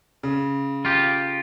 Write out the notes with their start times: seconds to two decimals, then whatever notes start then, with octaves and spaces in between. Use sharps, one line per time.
0.23 C#3
0.85 F4 G4